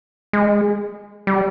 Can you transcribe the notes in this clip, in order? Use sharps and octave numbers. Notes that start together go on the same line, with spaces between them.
G#3
G3